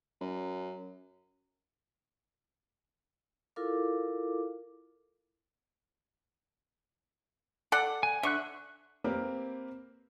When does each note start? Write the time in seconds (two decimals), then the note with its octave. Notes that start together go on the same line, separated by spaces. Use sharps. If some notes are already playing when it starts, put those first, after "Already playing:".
0.21 F#2
3.56 E4 F4 A4 A#4 F5 D6
7.72 A4 D5 F#5
8.03 G#5
8.23 D3 E5 C#6 F#6
9.04 A#3 C4 G4 A#4 B4